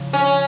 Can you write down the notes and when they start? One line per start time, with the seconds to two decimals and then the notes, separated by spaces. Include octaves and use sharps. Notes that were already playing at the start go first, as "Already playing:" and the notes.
Already playing: C#3 F3
0.13 C#4